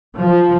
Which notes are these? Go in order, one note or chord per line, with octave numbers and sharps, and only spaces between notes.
F3